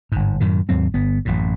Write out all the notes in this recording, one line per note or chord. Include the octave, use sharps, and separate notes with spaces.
G1 G#2
F#2 A2 D#3
D#2 G#2 F#3 C4
G1 B3
A1 F#2 A2